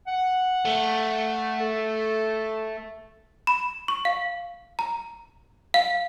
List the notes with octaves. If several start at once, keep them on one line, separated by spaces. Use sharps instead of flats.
F#5
A3
A4
B5
C#6
F5
A#5
F5